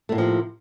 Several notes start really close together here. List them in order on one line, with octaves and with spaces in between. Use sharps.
A3 A2 A#3 F3 C3